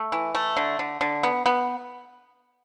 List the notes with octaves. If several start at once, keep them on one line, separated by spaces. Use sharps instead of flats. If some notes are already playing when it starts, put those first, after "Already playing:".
Already playing: A3
E3
A3
D3
D3
D3
B3
B3